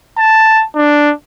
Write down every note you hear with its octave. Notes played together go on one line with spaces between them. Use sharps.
A5
D4